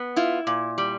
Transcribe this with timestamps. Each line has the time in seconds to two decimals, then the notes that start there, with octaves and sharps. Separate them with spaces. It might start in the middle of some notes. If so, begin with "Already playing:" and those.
Already playing: B3
0.16 E4 F4
0.47 A#2
0.78 G3